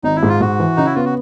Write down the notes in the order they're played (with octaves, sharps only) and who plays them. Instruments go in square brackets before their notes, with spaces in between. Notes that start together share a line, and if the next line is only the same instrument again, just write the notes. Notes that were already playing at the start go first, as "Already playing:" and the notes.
[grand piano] G#1 [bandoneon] D#4
[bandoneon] E4
[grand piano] G#2
[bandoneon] F4
[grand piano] G#2 [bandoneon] F#4
[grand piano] E3
[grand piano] C#3 [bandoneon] D#4
[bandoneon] E4
[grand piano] B3 [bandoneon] F4
[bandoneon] F#4